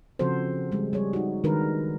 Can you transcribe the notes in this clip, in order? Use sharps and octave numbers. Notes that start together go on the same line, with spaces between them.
C#3 F3 C4 F#4 A4 C5
G3 G#3
G3 G#4 C#5
D#4 F#4
D#3 G#3 D4 A#4 B4